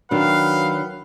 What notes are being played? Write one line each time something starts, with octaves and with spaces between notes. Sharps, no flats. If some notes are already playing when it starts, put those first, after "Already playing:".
D#3 F#3 D4 B4 F5